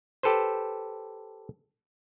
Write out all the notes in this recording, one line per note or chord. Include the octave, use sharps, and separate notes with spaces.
G4 A4 B4 C5